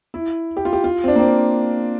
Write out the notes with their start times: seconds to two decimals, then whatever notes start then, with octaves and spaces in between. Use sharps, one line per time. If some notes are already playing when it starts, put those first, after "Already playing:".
0.14 E4
0.57 G4
0.65 F4
0.73 G4
0.84 F4
1.04 C4
1.08 D4
1.15 A#3
1.19 C4